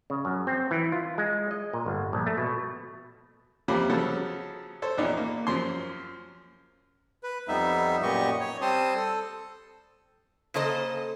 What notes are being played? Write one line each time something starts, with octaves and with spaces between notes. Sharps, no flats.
C#3
F#2
C4
E3
F4
G#3
D#5
A#2
G1
A#1
A3
B2
F2 C3 F3 A#3 C#4 B5
C#3 F3 F#3 B3 A4
A4 C5 C#5
A#1 E2 A#2 D#4
A#3
F#2 F3 C6
B4
F2 G3 B3 D#4 E5
F#2 A#2 B3 G4 D#5 C#6
C#5
G3 C4 C5 A5 C6 D#6
A4
C#3 A#3 A4 C5 D#5